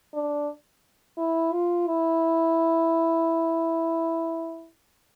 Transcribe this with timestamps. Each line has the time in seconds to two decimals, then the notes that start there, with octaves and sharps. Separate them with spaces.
0.14 D4
1.18 E4
1.53 F4
1.88 E4